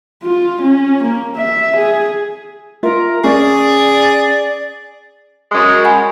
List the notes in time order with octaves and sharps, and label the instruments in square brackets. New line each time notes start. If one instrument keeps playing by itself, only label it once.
[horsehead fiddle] F4
C#4
A#3
E5
G#4
[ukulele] F4 E5 [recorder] A#4
[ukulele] C#4 [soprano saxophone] G#4 [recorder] D5
[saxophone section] F#2 G#3
[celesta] F#5 G#5 B5